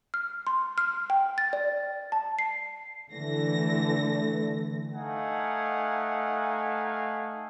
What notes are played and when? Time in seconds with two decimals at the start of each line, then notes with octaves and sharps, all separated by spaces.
0.14 F6
0.47 C6
0.78 F6
1.10 G5
1.38 A6
1.53 D5
2.12 A5
2.39 C7
3.13 D3 E3 A3 A#6
4.93 A3 D#4 F5 F#5 G#5